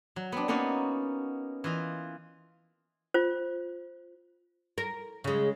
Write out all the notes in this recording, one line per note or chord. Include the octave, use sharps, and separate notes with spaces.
F#3
B3 C4 D4
A#3 B3 C#4 D#4 F#4 D5
E3 F4 D#5
F4 C5
A#4
C#3 G#3